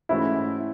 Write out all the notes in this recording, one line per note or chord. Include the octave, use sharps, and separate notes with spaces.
G#2 E3 A3 C#4 E4 F#4